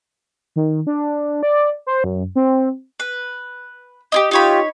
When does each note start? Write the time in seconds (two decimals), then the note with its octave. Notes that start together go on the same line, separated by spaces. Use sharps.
0.56 D#3
0.87 D4
1.43 D5
1.87 C5
2.04 F#2
2.36 C4
3.00 B4
4.12 D#4 E4 G4
4.31 D#4 F4 G4 C#5 B5